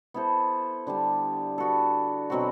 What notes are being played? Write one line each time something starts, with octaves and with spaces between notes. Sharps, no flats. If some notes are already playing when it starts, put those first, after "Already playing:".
B3 E4 A4 C5
D3 G3 D4
B3 F#4 A4
B2 F#3 C4 F#4